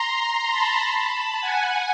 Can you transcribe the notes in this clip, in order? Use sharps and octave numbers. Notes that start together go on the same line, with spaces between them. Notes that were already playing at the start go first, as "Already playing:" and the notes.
Already playing: A#5 C6
A5 B5
F#5 G#5